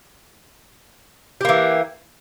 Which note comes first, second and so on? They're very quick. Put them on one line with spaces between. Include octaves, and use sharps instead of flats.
G4 A#3 E3